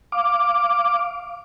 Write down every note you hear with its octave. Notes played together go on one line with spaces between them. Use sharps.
F5 D6